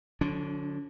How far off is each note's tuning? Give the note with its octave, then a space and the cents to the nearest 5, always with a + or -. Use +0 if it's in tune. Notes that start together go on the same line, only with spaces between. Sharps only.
D3 +0 F#3 -40 D4 -45